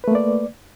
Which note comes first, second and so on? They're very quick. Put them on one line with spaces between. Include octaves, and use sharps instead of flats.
B4 A3 A#3 D5